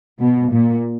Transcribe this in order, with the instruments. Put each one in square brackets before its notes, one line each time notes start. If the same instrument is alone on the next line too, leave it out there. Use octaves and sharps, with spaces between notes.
[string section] B2
A#2